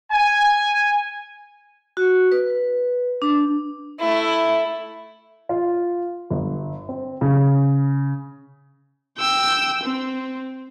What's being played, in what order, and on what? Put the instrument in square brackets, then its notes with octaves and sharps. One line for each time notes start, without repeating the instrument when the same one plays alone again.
[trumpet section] G#5
[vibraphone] F#4
B4
D4
[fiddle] A3 E4
[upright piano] F4
G1
C4
C#3
[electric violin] G5 E6
C4